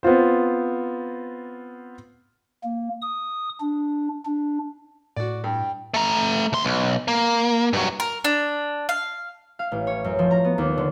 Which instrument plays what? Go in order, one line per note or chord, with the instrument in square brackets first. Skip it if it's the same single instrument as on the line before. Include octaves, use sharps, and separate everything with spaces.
[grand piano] B3 C4 F4 C5
[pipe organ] A#3
D#6
D4
D4
[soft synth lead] A2 [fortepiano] F#4 D5
[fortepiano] G2 [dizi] G5
[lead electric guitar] A3 A#5
C#2 C6
B1
A#3
G2 F#3
[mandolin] A#4
D4
F5
[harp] F5
A1
C#5
F#2
F3
A#5
B3
D#2
D3